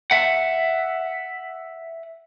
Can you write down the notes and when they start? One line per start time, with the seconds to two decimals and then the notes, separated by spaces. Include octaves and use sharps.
0.11 E5 F#5